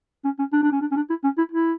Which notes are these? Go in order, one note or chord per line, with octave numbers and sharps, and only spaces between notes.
C#4
C#4
D4
D4
C#4
D4
C#4
D4
E4
C#4
E4
E4